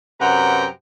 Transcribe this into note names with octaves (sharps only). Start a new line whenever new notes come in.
F#2 C3 B4 F#5 G5 A#5